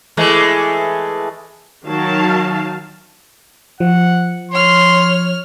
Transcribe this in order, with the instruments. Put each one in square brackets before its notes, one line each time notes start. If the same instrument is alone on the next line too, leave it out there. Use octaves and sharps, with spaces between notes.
[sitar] E3 G#3 A3
[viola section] D#3 F#3 F5 A5
[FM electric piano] F3 [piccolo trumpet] F#5
[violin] C#5 F6 [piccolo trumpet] C6